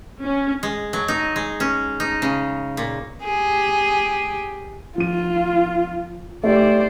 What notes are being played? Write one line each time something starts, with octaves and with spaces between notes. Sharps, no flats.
C#4
G#3
F#3
D#4
G#3
C#4
D#4
C#3
A#2
G4 G#4
F3 F4 D#7
A3 G4 C5 D5